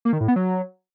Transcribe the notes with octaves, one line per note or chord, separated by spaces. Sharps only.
A#3
D#3
A2
B3
F#3